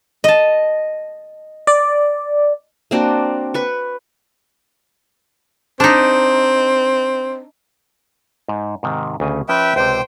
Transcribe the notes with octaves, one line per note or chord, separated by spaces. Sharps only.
D#5 A5
D5
A#3 C4 D4 F#4
B4 C#6
C4 D4 D#4
G#2
G#2 C3 D#3
D2 C#3 G#5
F3 C#4 B4 E5 G5
C#2 C3 C5 G5